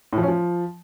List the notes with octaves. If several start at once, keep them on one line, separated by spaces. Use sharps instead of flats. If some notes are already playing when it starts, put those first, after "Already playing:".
A2
F3
C#4
F3